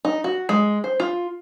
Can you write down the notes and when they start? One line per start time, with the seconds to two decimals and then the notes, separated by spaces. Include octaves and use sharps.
0.05 D#4
0.24 F#4
0.49 G#3
0.84 C5
1.00 F4